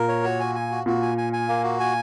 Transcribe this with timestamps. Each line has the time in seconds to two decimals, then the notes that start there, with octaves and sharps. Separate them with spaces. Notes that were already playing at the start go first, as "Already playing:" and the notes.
Already playing: A#2 A#4
0.08 C#5
0.24 F#4
0.40 G#5
0.55 G#5
0.71 F#4
0.86 A#2 F#4
1.02 G#5
1.18 G#5
1.33 G#5
1.48 A#3
1.64 F#4
1.80 G#5